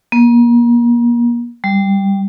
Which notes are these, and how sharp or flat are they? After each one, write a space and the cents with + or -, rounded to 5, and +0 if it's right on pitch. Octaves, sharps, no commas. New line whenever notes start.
A#3 +35
G3 +5